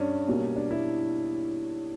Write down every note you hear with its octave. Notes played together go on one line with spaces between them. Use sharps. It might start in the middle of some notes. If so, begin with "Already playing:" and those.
Already playing: G2 C#4 D4
B1 B2 G3 A#3
D4
E4